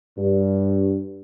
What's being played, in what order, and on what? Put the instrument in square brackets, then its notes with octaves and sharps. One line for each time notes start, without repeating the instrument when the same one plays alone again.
[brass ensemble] G2